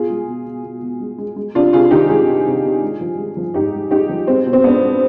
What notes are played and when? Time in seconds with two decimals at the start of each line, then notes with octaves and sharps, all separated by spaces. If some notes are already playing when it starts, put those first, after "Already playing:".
Already playing: B2 F4 G#4
0.10 G#3
0.28 B2
0.46 B2
0.64 B2
0.82 B2
1.00 G#3
1.18 G#3
1.36 G#3
1.55 C3 D4 F4
1.73 C3 F4 G#4
1.91 D#3 D#4 G4
2.09 G#3 F4 G#4
2.28 C3
2.46 C3
2.64 C3
2.82 G#3
3.01 F3
3.18 G#3
3.37 F3
3.54 G#2 D#4 G4
3.73 G#3
3.91 G#3 D#4 G4
4.09 F3
4.27 G#3 C4
4.46 B2
4.53 C4
4.64 G#3 B3 D4
4.81 G#3